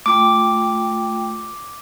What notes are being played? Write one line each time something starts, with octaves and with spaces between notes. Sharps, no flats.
A3 F4 G5 D6